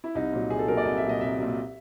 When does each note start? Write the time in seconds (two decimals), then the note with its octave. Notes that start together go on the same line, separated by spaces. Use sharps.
0.04 E4
0.15 C2 D#4
0.33 A#2 F#3
0.50 C2 G#4
0.59 A4
0.68 A#2 F#3 A#4
0.77 D5
0.85 C2 D#5
0.98 E5
1.03 A#2 F#3
1.09 D#5
1.21 C2 E5
1.38 A#2 F#3 E5